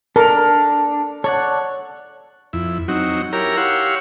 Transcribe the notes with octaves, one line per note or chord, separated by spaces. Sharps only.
D4 A4 A#4
A4 C#5 D5 F#5
F2 E4
F#3 C4 D#4 F#4
E4 G4 A#4 C#5 A#5
G4 C#5 F5 F#5 C6 E6